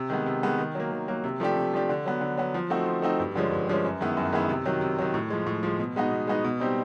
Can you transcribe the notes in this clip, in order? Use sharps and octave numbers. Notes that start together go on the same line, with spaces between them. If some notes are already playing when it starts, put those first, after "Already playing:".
Already playing: C3
D#3 G#3 B3
C3
D#3 G#3 B3
D#3
F#3 A#3
D#3
F#3 A#3
C3
F3 A3 D4 G4
C3
F3 A3 D4 G4
D3
F#3 B3
D3
F#3 B3
F3
A3 C4 D#4 F#4
F3
A3 C4 D#4 F#4
G2
D3 F3 G#3 C#4
G2
D3 F3 G#3 C#4
F#2
D#3 G#3 B3 E4
F#2
D#3 G#3 B3 E4
C3
D#3 F#3
C3
D#3 F#3
A2
F3 G#3
A2
F3 G#3
B2
G#3 B3 D#4 F#4
B2
G#3 B3 D#4 F#4
B2
G3 C4 D#4 G4